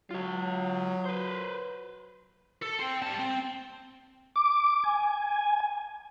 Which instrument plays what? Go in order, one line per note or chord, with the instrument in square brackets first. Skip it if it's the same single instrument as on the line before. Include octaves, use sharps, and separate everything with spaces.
[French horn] F#3 [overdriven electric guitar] F4 C#5
[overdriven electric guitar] B4 C5
[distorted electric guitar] A4
C4
G3 A5
C4
[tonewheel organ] D6
G#5